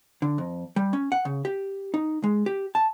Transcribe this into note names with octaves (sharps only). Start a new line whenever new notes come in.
D3
F2
G3
C#4
F#5
C#3
G4
D#4
G#3
G4
A5